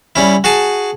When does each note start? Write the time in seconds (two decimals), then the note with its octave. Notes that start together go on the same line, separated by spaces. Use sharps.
0.16 G3 C#4 E4
0.44 F#4 G#4 G#5 A5